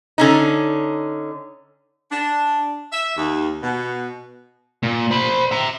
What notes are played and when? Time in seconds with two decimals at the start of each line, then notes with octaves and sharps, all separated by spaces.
0.18 D3 C#4 D#4
2.11 D4
2.93 E5
3.16 D#2
3.63 B2
4.83 A#2
5.11 C5 B5
5.51 E5 A#5